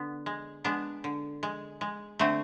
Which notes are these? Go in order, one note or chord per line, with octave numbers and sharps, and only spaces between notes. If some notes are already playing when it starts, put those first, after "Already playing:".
Already playing: D3 B3
G#3
G#3 B3 D4
D3
G#3
G#3
D3 A3 C4